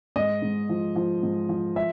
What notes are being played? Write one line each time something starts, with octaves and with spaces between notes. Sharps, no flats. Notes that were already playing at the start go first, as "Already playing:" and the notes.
G#2 D#5
G#2
F3
F3
G#2
F3
E5